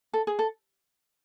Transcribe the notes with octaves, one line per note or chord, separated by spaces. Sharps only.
A4
G#4
A4